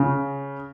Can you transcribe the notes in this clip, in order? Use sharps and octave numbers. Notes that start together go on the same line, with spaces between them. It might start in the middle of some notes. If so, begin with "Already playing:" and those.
Already playing: C#3